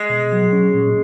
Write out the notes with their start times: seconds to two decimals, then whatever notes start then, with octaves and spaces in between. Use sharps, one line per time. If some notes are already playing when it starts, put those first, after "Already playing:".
Already playing: G#3
0.10 B2
0.32 F#3
0.52 C#4
0.74 A#2